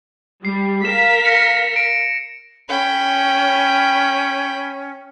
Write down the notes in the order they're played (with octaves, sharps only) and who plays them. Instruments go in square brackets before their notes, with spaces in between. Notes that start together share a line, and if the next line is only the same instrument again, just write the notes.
[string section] G3 [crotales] C7
[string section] A#4 F5 B6 [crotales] E7
[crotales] A#6 C#7
D7
[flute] C#4 [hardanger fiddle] G5 B5